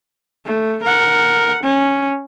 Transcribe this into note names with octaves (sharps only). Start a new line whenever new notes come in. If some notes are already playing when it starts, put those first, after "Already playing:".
A3
A#4 F#5
C#4